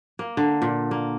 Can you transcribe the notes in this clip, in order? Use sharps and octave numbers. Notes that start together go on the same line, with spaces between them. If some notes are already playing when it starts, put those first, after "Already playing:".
A#3
D3
A#2
A#3